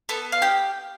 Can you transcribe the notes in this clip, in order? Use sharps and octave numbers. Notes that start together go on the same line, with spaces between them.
B3 A4
F5
G4 G5